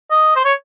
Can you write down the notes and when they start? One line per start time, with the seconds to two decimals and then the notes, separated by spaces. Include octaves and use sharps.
0.11 D#5
0.36 C5
0.45 C#5